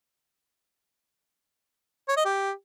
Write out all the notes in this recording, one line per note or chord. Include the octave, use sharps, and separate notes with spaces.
C#5
D#5
G4